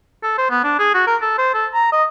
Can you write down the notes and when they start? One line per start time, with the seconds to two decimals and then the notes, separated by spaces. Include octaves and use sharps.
0.23 A4
0.38 C5
0.50 B3
0.64 D4
0.79 G#4
0.94 F#4
1.07 A#4
1.22 A4
1.38 C5
1.54 A4
1.74 A#5
1.92 D#5